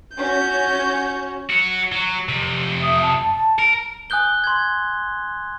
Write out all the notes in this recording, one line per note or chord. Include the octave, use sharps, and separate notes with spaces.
C#4 F#4 G6
F#4 C#5
F#3 F#4
F2 C3
E5 D#6
A5
A#4
G#5 D#6 F#6 G6 G7
C6 G#6